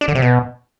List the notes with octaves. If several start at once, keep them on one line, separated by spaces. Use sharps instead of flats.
D4
D3
C3
B2